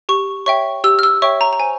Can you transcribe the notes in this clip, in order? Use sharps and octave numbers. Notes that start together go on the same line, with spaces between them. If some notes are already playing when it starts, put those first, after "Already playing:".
G4 C#6
C#5 E5 G5 C#6
G4 E6
F6
E6
C#5 E5 G5 C#6
A#5
A#5
C5 G#5